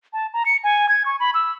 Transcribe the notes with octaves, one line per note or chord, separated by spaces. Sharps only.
A5
A#5
C#7
G#5
G#6
C#6
B5
E6